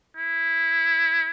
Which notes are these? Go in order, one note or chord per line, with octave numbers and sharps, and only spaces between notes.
E4